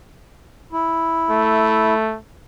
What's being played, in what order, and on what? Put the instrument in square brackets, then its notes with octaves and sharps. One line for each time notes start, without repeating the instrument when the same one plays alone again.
[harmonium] E4
[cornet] A3